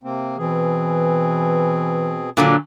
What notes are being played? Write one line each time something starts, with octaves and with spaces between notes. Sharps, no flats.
C3 A#3 C4
B2 E3 C4 G#4
A#2 D3 F#3